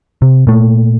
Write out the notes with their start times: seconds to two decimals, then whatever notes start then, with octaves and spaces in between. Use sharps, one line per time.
0.22 C3
0.47 A#2 A3